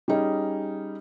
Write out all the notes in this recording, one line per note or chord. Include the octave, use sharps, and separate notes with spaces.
G3 C#4 D#4 G#4